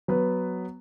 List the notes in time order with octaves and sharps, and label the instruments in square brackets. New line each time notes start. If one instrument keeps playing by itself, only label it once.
[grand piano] F#3 B3 B4